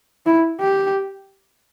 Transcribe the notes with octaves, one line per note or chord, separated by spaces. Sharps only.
E4
G4